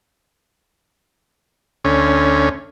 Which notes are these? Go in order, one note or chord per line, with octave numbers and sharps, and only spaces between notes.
D2 C#4